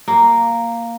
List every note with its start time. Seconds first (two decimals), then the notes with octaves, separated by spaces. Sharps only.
0.08 A#3